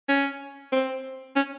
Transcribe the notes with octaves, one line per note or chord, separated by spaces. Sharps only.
C#4
C4
C#4